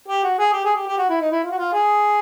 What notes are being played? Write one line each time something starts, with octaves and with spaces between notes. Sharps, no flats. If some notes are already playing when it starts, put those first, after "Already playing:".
G4
F#4
G#4
G4
G#4
G4
G4
F#4
E4
D#4
E4
F4
F#4
F4
G#4